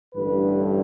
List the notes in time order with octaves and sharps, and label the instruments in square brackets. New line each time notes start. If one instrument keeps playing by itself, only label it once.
[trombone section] A1 G2 D3 B4